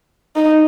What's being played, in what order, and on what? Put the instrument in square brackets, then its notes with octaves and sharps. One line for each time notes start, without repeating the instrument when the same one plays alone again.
[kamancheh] D#4